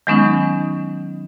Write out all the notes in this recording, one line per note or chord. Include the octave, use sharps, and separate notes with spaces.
D#3 F#3 G#3 B3 C#4 D#4